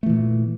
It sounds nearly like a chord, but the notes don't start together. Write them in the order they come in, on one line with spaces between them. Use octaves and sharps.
A3 E3 A#2